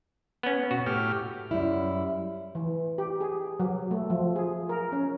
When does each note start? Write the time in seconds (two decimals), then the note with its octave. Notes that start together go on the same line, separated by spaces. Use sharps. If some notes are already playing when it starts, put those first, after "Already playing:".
0.43 B3 C#4
0.71 B2 F#4
0.86 A2 G4 F6
1.51 F#2 G3 E4
2.55 E3
2.98 G4
3.21 G#4
3.60 F#3
3.91 A3
4.10 F3
4.36 G#4
4.69 A#4
4.92 C#4